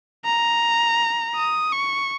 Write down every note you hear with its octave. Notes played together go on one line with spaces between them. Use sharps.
A#5
D#6
C#6